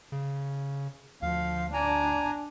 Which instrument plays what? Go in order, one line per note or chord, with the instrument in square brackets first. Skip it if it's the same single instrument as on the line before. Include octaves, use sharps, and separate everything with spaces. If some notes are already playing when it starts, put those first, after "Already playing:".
[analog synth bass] C#3
[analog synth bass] D2 [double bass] F3 [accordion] F5
[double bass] D4 [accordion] G#5 A#5